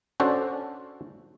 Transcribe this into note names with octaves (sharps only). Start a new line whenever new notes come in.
C#4 D4 F#4 A4 C5